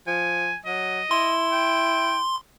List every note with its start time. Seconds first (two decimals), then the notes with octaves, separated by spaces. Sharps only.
0.07 F3 G#5
0.66 F#3 D#5
1.11 E4 C6
1.52 G5